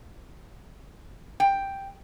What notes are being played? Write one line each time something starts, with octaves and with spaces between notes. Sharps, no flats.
G5